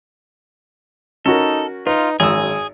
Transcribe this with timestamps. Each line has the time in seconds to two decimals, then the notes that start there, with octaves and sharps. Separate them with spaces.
1.26 C#4 D#4 F#4 A4 A#4
1.87 D#4 F4 B4
2.20 G#1 F#2 G#4 D#6 E6